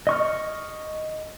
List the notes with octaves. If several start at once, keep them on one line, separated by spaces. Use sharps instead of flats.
D#5 C#6 F6